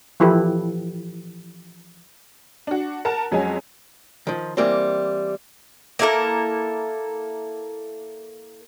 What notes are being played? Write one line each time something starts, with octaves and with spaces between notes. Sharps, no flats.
E3 F3 E4 G4 A4 B4
D4 F#4
A#4 F#5 A5 A#5
F2 F#3 G#3 C#4 G#5
D#3 F3
E3 G3 A#3 C4
A#3 E4 A4 A#4